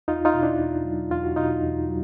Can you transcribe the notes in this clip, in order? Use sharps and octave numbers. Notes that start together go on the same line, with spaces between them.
E2 D#4 F4
D#4 F4
B2
D4 E4
E2
F#3
E2 F4
F#4
B2 D#4 F4
E2
F#3